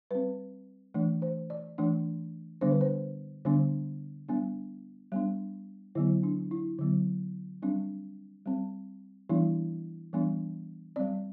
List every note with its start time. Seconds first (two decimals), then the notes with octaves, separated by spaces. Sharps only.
0.11 G3 C4 B4
0.94 E3 A3 D4
1.22 C5
1.50 D5
1.78 E3 A3 D4
2.61 D3 G3 B3 D4 C5
2.71 B4
2.81 C5
3.45 D3 G3 B3 D4
4.29 G3 B3 D4
5.12 G3 B3 D4
5.95 D3 F#3 B3 E4
6.23 D4
6.51 E4
6.79 D3 F#3 B3
7.62 G3 C4 D4
8.46 G3 C4
9.29 E3 G3 B3 D4 E4
10.13 E3 G3 B3 D4
10.96 G3 C4 D5